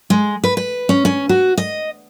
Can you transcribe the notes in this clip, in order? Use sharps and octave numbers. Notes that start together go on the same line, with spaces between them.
G#3
B4
B4
C#4
C#4
F#4
D#5